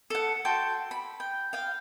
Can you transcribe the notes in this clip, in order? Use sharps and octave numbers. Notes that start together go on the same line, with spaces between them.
A4 F#5
F#4 G5 A5 C6
B5
G5
F5 G5